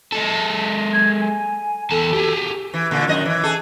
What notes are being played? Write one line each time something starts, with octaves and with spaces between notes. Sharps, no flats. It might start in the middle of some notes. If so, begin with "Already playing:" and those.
G#3 A4
G#6
G#5
E2 A4 A5
G4 G#4
E3
A#2 D3
F#2 D#3 D#5
E3
G#4 A4